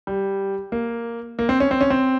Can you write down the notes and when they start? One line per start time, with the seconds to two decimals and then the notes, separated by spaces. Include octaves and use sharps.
0.07 G3
0.72 A#3
1.39 A#3
1.49 C4
1.60 C#4
1.71 C4
1.81 C#4
1.90 C4